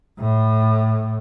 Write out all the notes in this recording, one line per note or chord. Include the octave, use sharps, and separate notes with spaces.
A2